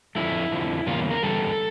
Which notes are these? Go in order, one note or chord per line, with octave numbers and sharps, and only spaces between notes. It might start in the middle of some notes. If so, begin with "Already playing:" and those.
F2 D3 F3 A3 E4
F2 D3 F3 A3
E2 C#3 G3 A#3 F4
A#4
E2 C#3 G3 A4